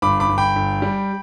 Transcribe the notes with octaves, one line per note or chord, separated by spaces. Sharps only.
G1 B5 D6
B5 D6
G1
G5 B5
G1
G3